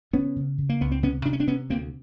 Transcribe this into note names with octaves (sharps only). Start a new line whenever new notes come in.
C#3 B3 C#4
C#3
C#3
A#3
C#2 B3
C4
C3 B3 C#4
C3 D4
C#4
C4 D4
C3 B3 C#4
D2 A#3 C4